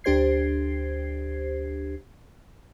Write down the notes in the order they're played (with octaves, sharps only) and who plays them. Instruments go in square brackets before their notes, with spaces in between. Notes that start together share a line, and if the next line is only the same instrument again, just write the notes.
[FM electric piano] D2 D4 G4 C5 G#6 C7